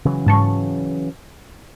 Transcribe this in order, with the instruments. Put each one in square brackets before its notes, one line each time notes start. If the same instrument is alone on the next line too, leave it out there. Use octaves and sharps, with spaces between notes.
[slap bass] C#3 E3 F#3
[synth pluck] G#2 A5 C#6